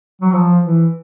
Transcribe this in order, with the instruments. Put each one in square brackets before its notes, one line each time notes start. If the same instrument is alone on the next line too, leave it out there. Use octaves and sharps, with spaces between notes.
[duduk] F#3
F3
E3